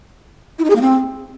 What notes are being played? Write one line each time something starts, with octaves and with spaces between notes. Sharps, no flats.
E4
D#4
G#4
A#3
C4